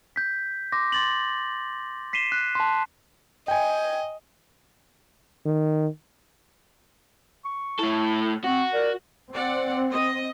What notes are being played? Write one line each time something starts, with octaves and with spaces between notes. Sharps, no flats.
G6 B6
C6 D6 A#6
C6 A6 F#7
B6 C7 D#7 E7 G7
F#6
A5 C6
D#5 G5 G#5
D#3
C#6
A2 E4 A4
C4 F#4 C#6
A#4 D5
C4 D5 F#5
D#5